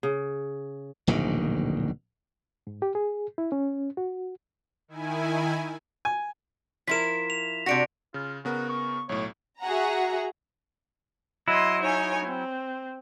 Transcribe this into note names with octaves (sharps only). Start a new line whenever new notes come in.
C#3
D1 A#1 B2 D#3
G#2
G4
G#4
E4
C#4
F#4
D#3 E4 G#5
G#5
F3 E4 A#4 B6 E7
F7
C3 D4 F#4 A#6 C#7 D7
C#3 F4
C#3 B3 F#4 A#4
C#6
B1 A2 C#5
F#4 G#4 E5 F#5 A#5
F#3 E4 D#5 C6
D#4 C#5 G#5
C4